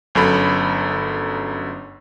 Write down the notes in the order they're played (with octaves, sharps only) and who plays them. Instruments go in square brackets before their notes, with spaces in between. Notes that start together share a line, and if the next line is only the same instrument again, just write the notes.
[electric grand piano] G1 F#2 A4 B5